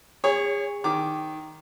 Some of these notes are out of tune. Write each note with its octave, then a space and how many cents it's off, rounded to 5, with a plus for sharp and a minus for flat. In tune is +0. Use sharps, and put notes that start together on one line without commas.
G#4 -35 C#5 +0
D#3 +0 D6 +0